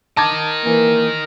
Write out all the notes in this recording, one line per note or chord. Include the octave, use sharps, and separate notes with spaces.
A#4 D#5 A5 D6 G#6
E3 A#3